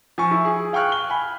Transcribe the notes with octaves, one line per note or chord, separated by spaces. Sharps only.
F3 G#5 C#6
E4
G#4
F5 G5 C#6 F6 F#6
G7
G#5 B5